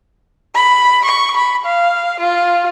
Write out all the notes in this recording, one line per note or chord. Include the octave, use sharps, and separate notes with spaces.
B5
C#6
B5
F5
F4